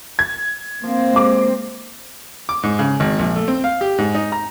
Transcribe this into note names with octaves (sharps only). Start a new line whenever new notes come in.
G#6
F3 A#3 C4
C3 G#3 D6
D6
G#2
C#3
G#1
A#1
A3
C4
F5
G4
G#2
D#4
A#5